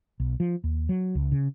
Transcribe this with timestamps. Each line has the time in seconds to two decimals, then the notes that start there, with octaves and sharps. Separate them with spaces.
0.20 B1
0.40 F3
0.64 D#2
0.89 F#3
1.15 C#2
1.32 C#3